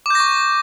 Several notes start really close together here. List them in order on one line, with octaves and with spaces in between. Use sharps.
D6 G6 A#6 C#6